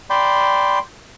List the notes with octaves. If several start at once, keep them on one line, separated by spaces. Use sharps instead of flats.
D5 G5 B5 C6